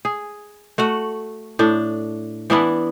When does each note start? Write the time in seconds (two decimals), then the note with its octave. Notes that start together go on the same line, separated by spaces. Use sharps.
0.05 G#4
0.78 A3 F#4 F#5
1.59 A2 D4
2.50 E3 B3 D4 E4